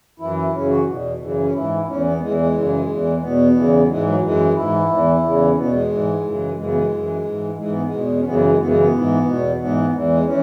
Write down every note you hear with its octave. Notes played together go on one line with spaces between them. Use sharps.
F#2 E3 E4
E4
F#2 C#3 E3 C#4
F#4
E2 B2
F#2 C#3 E3
C#4
G#2 E3 E4
E2 E3 C#4
B3
E2 E3 G#3
G#3
F#2 C#3 E3
E2 E3
E2 B2 B3
E2 C#3 E3
F#3
G#2 E3 G#3
F#3
F#2 E3 G#3
G#2 E3 E4
E2 E3
E2 C#3 E3
C#4
E2 B2 B3
G#3
G#2 E3
F#2 C#3 E3
F#2 C#3 E3 G#3
B3
G#3
F#2 E3
G#2 E3
G#2 E3 G#3
B3
G#3
E2 B2
C#4
F#2 C#3 E3 B3
G#3
G#3
F#2 C#3 E3 B3
G#3
B3
G#2 E3
E2 B2
G#2 E3 B3
E2 E3
G#3
E3 C#4